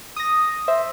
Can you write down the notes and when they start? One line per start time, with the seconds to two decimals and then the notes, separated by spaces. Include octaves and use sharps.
0.16 D#6 A#6
0.68 C5 E5